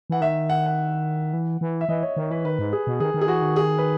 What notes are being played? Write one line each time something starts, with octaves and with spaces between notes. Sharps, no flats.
E3 F#5
D#3 E5
F#5
F#5
E3
E3
E5
E3 D#5
C#5
D#3 C#5
E3 B4
D#3 B4
G#2
G#4
B2
D#3 G#4
D#3
G#4
E3 F#4
D#3
G#4
B4